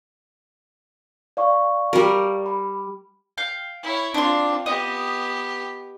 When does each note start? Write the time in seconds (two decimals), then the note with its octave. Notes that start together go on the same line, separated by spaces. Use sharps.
1.37 D5 F5 C#6
1.93 G3 A#4
2.46 B5
3.37 F5 G5 F6
3.83 E4 C#5
4.14 C4 D4 F4 C6
4.66 B3 G4 D#5